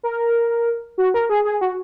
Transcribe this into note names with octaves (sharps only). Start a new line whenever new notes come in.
A#4
F#4
A#4
G#4
G#4
F#4